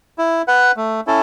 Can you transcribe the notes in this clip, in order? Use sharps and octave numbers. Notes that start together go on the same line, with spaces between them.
E4
B4 F#5
A3
C#4 E4 A4